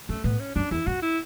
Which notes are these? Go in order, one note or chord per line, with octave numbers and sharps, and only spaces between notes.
F#2 A3
A2 B3
C#4
F#2 D4
E2 E4
F#2 F#4
E4